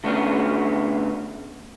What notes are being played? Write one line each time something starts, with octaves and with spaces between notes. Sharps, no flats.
D3 A3 B3 C#4 D4